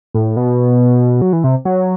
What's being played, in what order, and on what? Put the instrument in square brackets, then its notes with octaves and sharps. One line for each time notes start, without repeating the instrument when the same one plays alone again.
[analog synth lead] A2
B2
F#3
E3
C3
F#3